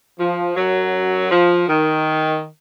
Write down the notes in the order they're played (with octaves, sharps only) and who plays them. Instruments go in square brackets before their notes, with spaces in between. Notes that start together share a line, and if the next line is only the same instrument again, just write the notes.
[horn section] F3
F#2 F#3
F3
D#3